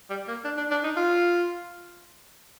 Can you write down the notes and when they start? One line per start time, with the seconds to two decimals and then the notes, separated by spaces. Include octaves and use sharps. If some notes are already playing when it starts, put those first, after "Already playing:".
0.10 G3
0.28 A#3
0.44 D4
0.57 D4
0.71 D4
0.84 D#4
0.97 F4